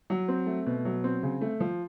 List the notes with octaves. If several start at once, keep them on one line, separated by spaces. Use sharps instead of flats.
F#3
C4
A3
B2
F#3
C4
C#3
A3
F3